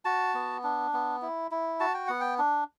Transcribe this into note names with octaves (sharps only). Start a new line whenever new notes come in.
F#4 A5
B3
D4
B3
E4
E4
F#4 A5
G5
B3 F#5
G5
D4